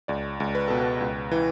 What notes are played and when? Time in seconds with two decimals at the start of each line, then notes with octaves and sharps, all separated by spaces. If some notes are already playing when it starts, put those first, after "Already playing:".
0.08 C#2 D5
0.40 C#2
0.55 B4
0.68 B2 A4
0.81 B4
1.01 C#2
1.31 E3